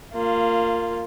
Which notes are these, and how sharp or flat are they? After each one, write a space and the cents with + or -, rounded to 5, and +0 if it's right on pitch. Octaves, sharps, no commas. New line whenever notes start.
A#3 -20 F4 +0